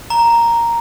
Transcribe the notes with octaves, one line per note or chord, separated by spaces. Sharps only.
A#5